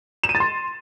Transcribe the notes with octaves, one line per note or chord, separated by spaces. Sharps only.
E7
D#7
A6
C6